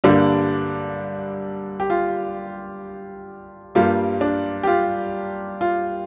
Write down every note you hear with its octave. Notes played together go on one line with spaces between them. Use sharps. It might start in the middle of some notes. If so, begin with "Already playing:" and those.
G2 D3 G3 A#3 D4
G4
F4
G2 G3 A#3 F4
D4
G4
F4
F4